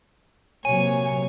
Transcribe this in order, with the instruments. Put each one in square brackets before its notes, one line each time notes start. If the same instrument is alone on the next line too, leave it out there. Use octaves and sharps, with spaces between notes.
[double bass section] C3 F#3 A#3 [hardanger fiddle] C#5 [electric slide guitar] G#5